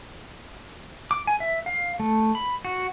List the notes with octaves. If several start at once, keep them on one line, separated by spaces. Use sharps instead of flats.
D6
G#5
E5
F5
A3
B5
F#4